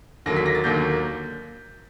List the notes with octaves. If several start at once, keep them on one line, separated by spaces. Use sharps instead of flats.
D#2 D3 F#3 A#3 A#6
B6
A#6
A6
D#2 D3 F#3 A#3 G6